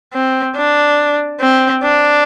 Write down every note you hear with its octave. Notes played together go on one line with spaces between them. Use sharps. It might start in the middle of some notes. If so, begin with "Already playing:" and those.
C4
D4
C4
D4